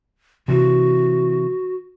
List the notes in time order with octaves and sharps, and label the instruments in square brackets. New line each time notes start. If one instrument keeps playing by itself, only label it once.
[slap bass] C3 E3 [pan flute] F#4